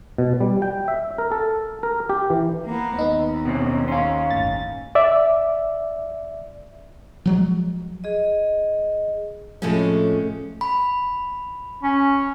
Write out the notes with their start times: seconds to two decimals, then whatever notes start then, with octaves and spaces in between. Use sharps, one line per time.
0.18 B2
0.40 G3
0.62 G5
0.88 E5
1.18 A#4
1.32 A4
1.83 A#4
2.09 G4
2.30 E3
2.66 A#3 B3
2.99 D#2 B3 D#4
3.45 B2 C4 C#4
3.88 C#4 F5 C6
4.31 G1 A2 A6
4.95 D5 E5
7.26 F3 F#3 G#3
8.04 G#4 D#5
9.62 A2 C3 F3 G#3 A3 C#4
10.61 B5
11.83 C#4